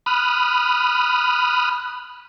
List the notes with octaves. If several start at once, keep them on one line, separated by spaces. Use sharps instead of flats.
B5 D#6 F6 F#6